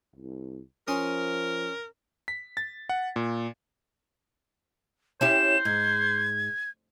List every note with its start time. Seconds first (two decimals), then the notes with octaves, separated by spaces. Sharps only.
0.15 C2
0.88 F3 C#4 A#4 C6 D#6
2.28 B6
2.57 A6
2.89 F#5
3.16 A#2
5.21 C#4 E4 G4 C5 E7
5.65 G#2 G#6